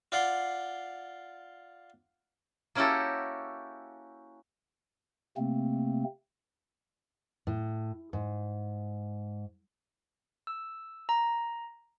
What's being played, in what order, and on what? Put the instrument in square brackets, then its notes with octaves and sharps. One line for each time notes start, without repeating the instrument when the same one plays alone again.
[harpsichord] F4 D5 F#5 C6
[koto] A#3 C#4 E4 F#4 G4 A4
[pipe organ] C3 A3 A#3 C4
[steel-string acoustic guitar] A2
G#2
[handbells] E6
A#5